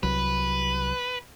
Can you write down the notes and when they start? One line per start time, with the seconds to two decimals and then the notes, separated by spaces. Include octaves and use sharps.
0.03 C2 F#3 B4